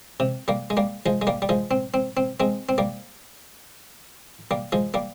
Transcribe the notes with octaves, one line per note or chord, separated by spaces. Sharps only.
C3
G3 A#3
G#3
G3 A#3
F3 G#3
G#3
G3 A#3
G3
F3 G#3
C4
C4
C4
G#3 C4
C4
G3 A#3
G3 A#3
F3 G#3
G3 A#3